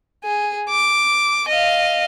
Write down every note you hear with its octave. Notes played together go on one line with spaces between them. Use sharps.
G#4
D6
D#5 F5